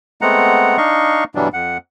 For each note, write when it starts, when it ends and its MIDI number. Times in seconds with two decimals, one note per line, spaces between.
0.21 0.77 56
0.21 0.77 57
0.21 0.77 59
0.21 0.77 60
0.21 0.77 78
0.21 0.77 82
0.77 1.24 62
0.77 1.24 63
0.77 1.24 75
0.77 1.24 77
0.77 1.24 85
1.35 1.48 43
1.35 1.48 47
1.35 1.48 52
1.35 1.48 54
1.35 1.48 55
1.35 1.48 62
1.54 1.78 41
1.54 1.78 78